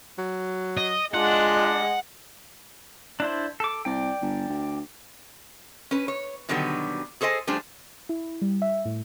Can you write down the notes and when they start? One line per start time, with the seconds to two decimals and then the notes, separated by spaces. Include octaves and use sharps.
0.18 F#3
0.77 D#5
1.14 G#3 D4 F4 D#5 F#5
3.20 D4 E4 C5
3.60 A4 D6
3.85 C2 D5 G5
4.21 G1
4.49 D2
5.91 C#4 B4
6.08 C#5
6.49 B2 D3 D#3 F#3 G3 B3
7.21 G#4 A4 C5 D#5 G#5
7.47 F3 G3 A3 D4 G#4 C5
8.09 E4
8.42 G3
8.62 E5
8.85 A2